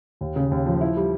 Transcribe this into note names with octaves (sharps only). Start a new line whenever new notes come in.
D#2
C#3
D#2
F3
E4
G3